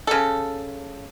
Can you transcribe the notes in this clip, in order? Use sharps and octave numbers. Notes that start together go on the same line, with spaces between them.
C#3 A4